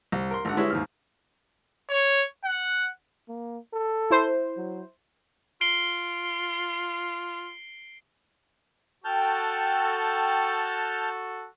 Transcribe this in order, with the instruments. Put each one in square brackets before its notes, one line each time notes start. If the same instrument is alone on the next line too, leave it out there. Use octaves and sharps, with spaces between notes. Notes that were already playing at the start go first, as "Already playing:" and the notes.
[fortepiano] C2
A#4 C6
G#1 D3 F#5
G3 G#3 E4 B4 C#5
D#2 G#2 F6
[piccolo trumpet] C#5
F#5
[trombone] A#3
A4
[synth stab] E4 C5
[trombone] F#3
[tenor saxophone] F4 [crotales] C7 D7 G7
[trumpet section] F#4 A4 [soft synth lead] G5 [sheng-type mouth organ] A5 F6 G6